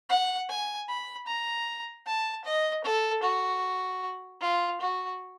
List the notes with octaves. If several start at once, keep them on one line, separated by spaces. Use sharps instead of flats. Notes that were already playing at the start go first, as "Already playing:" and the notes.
F#5
G#5
B5
A#5
A5
D#5
A4
F#4
F4
F#4